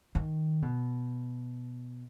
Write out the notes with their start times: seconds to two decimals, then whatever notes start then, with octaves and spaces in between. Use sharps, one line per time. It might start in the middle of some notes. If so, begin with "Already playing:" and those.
0.15 D#3
0.62 B2